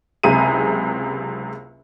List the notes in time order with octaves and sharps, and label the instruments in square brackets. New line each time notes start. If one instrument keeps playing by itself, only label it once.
[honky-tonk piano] F#1 C#2 C3 G#4 A#5 D#7